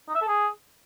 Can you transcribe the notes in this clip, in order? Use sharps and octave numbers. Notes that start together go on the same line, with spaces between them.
D#4
E5
A4
G#4